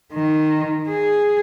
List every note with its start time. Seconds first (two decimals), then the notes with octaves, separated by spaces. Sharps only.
0.13 D#3
0.89 G#4